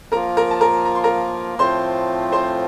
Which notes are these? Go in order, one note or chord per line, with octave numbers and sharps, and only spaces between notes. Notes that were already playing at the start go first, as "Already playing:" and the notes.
F3 A#3 F4 A#4 A#5
A#4 A#5
A5
A#4 A#5
A#5
C6
A#4 A#5
A2 F3 A3 C4 F4 C5 C6
C5 C6